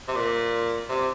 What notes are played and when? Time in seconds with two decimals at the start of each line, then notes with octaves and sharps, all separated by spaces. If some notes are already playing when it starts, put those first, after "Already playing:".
0.08 C3
0.16 A#2
0.89 C3